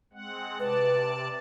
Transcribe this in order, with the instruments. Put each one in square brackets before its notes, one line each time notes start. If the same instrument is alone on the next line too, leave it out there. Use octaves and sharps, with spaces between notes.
[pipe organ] G#3 C4 F#5
[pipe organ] C3 D5 A5 [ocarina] B4